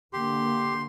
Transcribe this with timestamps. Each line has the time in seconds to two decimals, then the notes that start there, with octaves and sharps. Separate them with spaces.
0.13 D3 A#3 G4 C6